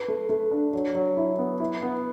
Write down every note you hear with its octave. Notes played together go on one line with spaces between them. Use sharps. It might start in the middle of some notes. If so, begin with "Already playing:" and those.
Already playing: B4
A3
A3
D4
F#3
F#3
E4
B3
E4
B3